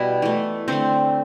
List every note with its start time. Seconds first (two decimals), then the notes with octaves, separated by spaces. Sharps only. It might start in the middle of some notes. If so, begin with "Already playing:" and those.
Already playing: B2 G3 B3 E4
0.22 E3 A3
0.68 D3 A3 C4